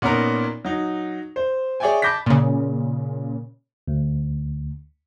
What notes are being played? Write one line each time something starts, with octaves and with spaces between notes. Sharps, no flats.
A#2 B3 C#4 D#4 A#4
F#3 D#4
C5
G#4 C#5 D5 E5 G5 G#5
A5 B5 D6 G6 A#6 B6
A#2 C#3
D2